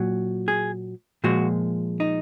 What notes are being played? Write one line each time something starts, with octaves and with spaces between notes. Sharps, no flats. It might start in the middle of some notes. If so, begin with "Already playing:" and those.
Already playing: A#2 F#3
G#4
A#2 F3 G#3 F#4
D#4